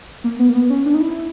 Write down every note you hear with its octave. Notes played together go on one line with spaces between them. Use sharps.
A#3
B3
A#3
B3
C#4
D4
D#4
E4